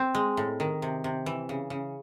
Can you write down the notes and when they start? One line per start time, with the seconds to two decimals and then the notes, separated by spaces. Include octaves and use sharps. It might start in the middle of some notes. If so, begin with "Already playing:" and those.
Already playing: C4
0.15 G#3
0.37 A2
0.60 D#3
0.82 C3
1.04 C3
1.26 E3
1.49 C#3
1.70 C#3